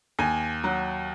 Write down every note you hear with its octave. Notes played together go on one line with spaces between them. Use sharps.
D#2 G#5
F#3